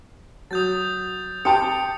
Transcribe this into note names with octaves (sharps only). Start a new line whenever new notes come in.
F#3 D#6 G6 A6
G4 G5 A5 D#6 C#7